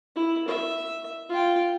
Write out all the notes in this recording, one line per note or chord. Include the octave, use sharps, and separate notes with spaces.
E4
E5
F4 G5